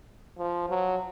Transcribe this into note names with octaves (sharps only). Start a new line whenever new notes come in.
F3
F#3